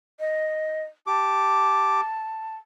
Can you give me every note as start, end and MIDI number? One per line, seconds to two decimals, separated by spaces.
0.20 0.82 75
1.07 2.01 67
1.07 2.56 81
1.07 2.01 86